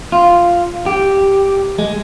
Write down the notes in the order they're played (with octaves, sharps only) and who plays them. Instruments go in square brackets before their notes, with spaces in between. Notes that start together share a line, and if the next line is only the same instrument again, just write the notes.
[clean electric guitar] F4
G4
G#3